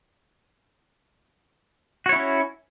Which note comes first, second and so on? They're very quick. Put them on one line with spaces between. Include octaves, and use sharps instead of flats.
F#4 C#5 E4 C#4